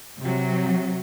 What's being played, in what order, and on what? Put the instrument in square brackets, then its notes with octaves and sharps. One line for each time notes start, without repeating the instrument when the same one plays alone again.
[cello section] C3 F#3